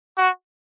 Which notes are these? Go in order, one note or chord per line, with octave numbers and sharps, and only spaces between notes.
F#4